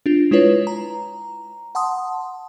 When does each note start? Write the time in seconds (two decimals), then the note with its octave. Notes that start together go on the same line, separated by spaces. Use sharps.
0.06 D4 F4
0.31 G#3 E4 F4 B4 C#5
0.67 A#5
1.75 F#5 A5 C6 D#6